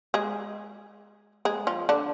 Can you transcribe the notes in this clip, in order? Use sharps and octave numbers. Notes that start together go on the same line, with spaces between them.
G#3 G#4
G#3 G#4
F3 F4
D3 D4